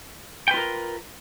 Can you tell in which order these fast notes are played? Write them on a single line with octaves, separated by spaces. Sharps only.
G5 B4 F4 A#4